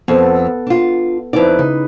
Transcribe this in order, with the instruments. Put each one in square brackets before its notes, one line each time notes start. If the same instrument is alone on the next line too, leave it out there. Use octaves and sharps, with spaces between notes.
[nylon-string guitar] F2 [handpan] B3 A4
[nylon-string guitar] D4 F4
[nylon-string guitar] F2 D5 [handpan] D#4 E4 B4
[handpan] C#3 [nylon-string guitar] D#4